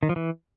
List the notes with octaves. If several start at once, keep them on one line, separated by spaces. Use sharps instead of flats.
D#3
F3
E3